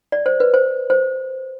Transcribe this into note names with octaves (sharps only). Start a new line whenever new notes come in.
D5
C5
B4
C5
C5